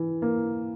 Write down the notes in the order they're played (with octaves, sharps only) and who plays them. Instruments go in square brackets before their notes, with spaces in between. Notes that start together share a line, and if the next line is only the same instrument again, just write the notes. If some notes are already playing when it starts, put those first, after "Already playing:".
Already playing: [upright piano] E3
A#3